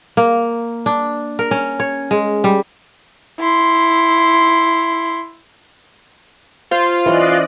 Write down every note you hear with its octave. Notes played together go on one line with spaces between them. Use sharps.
A#3
D4
A#4
C#4
C#5
G#3
G3
E4 C6
F4 C5
E3 C#4 D5 D#5 F#6